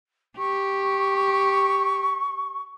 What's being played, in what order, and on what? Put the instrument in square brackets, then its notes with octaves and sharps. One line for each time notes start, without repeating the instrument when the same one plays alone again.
[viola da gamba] G4 [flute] C#6